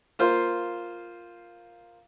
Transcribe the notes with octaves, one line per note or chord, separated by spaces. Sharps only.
A#3 F4 C5